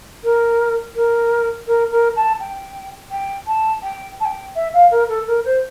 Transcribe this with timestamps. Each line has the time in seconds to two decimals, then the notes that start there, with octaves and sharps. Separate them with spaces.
0.23 A#4
0.95 A#4
1.67 A#4
1.91 A#4
2.15 A5
2.40 G5
3.11 G5
3.47 A5
3.83 G5
4.20 A5
4.25 G5
4.55 E5
4.73 F5
4.91 A#4
5.08 A4
5.27 A#4
5.44 C5